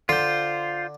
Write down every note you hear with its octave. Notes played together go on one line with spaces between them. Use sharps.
D3 F4 C5